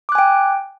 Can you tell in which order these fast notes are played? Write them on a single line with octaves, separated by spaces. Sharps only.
D6 F#6 G#5 G5